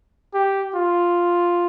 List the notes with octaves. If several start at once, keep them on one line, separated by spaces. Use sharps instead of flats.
G4
F4